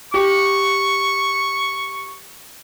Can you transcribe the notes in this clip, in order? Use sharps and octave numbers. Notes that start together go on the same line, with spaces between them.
G4 C#6